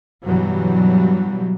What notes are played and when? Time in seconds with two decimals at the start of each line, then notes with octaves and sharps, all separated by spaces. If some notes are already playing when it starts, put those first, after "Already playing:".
0.25 G2 B2 E3 F#3 G3